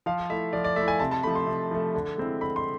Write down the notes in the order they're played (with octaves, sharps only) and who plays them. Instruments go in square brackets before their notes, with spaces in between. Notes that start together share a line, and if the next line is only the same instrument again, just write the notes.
[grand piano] F3 F5
A3 E4 E5
F3 D5
D5
A3 E4 E5
G#5
C3 A5
A5
F3 A3 B5
C6
C3
F3 A3
D3
G#3 C4 E4
D3 B5
C6